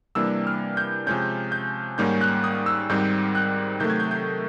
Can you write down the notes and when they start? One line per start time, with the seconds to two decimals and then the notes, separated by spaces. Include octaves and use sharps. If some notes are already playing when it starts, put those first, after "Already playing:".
0.15 C3 E3 G3 A#3 D4 E6
0.47 F6
0.77 G6
1.07 C3 F3 G#3 C#4 G6
1.52 G6
1.98 G#2 D#3 G3 A#3 C#4 G6
2.21 F#6
2.44 D#6
2.66 E6
2.90 G#2 D#3 G3 C4 D#4 G6
3.35 F#6
3.80 C3 D#3 F#3 A3 G6
3.90 G#6
4.00 G6
4.11 G6